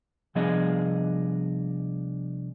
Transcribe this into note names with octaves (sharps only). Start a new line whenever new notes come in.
C2 F3 B3 D4 G#4 D#5